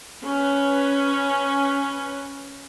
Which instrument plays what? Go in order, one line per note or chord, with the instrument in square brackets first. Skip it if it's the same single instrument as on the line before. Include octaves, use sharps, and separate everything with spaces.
[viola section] C#4 B4